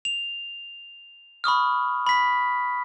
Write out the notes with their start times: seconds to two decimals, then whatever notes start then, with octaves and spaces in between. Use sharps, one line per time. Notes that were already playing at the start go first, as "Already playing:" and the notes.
0.05 F7
1.44 B5 C#6 D#6 F6
2.07 B5 B6